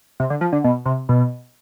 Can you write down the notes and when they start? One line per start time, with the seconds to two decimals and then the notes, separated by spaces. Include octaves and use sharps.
0.20 C3
0.30 D3
0.41 F3
0.52 D3
0.64 B2
0.85 C3
1.09 B2